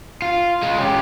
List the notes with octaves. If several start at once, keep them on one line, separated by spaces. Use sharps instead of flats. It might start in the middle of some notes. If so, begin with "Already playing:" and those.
F4
G#3 F4
C#4 G4